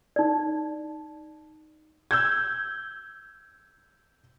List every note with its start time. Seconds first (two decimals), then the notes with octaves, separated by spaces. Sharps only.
0.16 D#4 D5
2.11 E6 G6 G#6